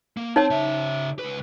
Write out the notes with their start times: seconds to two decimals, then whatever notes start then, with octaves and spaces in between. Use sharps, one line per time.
0.17 A#3
0.36 C4 D#4 C#5 A5
0.50 C#3 E5
1.19 C#2 B4